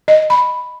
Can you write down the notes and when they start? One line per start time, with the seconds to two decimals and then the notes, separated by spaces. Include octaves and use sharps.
0.08 D#5
0.30 B5